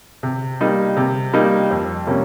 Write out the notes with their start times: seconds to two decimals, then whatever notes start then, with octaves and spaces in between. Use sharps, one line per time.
0.23 C3
0.61 G3 A#3 D#4
0.97 C3
1.33 G3 A#3 D#4
1.71 F2
2.07 C3 G3 A#3 C#4